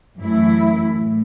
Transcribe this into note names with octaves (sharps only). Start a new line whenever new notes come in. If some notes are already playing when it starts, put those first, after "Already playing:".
F#2 E3 A3 E4
A2